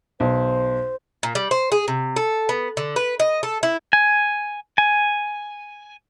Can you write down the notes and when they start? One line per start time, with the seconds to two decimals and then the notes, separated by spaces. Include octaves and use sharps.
0.20 B1 C5
1.23 A#2
1.35 G3
1.51 C5
1.72 G#4
1.88 C3
2.16 A4
2.49 B3
2.77 D3
2.96 B4
3.20 D#5
3.43 A4
3.63 E4
3.93 G#5
4.78 G#5